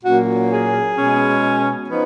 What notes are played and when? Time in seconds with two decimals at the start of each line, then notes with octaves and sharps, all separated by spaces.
0.02 A#2 F#3 A#3 C#4 F#4
0.50 G#4
0.96 B2 G#3 C#4
1.89 F3 B3 D#4